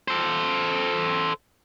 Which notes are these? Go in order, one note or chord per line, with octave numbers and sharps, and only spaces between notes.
A4 C5